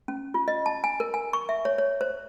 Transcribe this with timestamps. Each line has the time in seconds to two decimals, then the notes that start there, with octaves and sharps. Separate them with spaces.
0.08 C#4
0.34 F4
0.48 D#5
0.66 A5
0.84 G#5
1.00 A#4
1.14 G#5
1.33 C#6
1.49 E5
1.65 C#5
1.78 C#5
2.01 C5